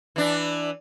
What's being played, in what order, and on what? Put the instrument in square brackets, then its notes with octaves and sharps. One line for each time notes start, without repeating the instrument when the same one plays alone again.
[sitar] E3 D4